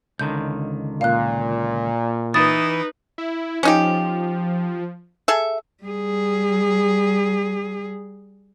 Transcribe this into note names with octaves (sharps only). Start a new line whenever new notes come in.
C#2 D3 D#3 G6
A#2 F5 F#6
E3 D#4 E4 B4 D#6 A6
E4
F3 C#4 D#4 G4
G#4 A4 E5
G3 G#4